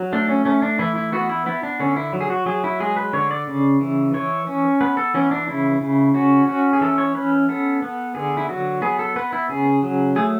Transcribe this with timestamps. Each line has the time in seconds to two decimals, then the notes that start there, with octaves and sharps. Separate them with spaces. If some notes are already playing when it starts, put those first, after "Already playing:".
Already playing: F#3
0.13 A3 D4
0.29 C#4
0.45 A3 C#4
0.62 D4
0.79 E3 E4
0.96 E4
1.12 B3 F#4
1.29 E4
1.46 B3 E4
1.63 D4
1.80 D3 C#4
1.96 E4
2.13 F#3
2.21 G#4
2.30 F#4
2.46 F#3 G#4
2.64 E4
2.80 G#3 G#4
2.96 B4
3.13 D3 C#5
3.31 D5
3.47 C#3
3.81 E3
4.14 E3 C#5
4.47 C#4
4.81 B3 B4
4.97 A4
5.14 E3 C#4
5.31 D4
5.48 C#3 E4
5.81 C#3
6.14 C#4 F#4
6.47 C#4 F#4
6.73 G#4
6.81 E3 A4
6.98 C#5
7.15 C#4 B4
7.49 B3 A4
7.82 B3
8.15 D3 G#4
8.37 E4
8.49 F#3 F#4
8.82 B3 G#4
8.99 A4
9.16 B3 B4
9.33 E4
9.49 C#3 G#4
9.82 F#3
10.16 A3 G#4